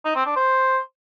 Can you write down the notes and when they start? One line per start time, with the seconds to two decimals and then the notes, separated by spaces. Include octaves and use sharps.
0.05 D#4
0.15 C4
0.26 D4
0.36 C5